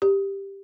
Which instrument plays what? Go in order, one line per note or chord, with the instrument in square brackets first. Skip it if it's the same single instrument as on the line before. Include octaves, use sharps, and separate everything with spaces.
[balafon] G4